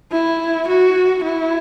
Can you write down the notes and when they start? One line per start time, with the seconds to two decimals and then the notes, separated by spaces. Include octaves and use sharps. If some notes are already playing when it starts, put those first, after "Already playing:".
0.12 E4
0.68 F#4
1.24 E4